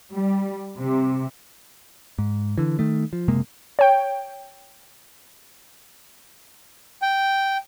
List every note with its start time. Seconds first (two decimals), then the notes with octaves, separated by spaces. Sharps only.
0.12 G3
0.76 C3
2.19 G#2
2.58 D3 E3
2.79 D#3 A3
3.13 F3
3.28 F#1 C3 G#3 A#3
3.79 C#5 G5
7.02 G5